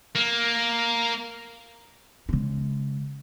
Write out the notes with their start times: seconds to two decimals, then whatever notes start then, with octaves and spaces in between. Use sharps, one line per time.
0.16 A#3
2.29 C#3 G#3